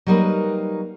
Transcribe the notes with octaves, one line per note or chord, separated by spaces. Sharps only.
F#3 G3 A#3 D#4 A#4 B4